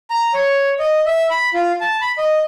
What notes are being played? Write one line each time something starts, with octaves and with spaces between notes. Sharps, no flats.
A#5
C#5
D#5
E5
B5
F4
A5
B5
D#5